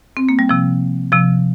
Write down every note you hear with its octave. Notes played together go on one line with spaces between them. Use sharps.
C4
A#3
G3
C3 F3
C3 F3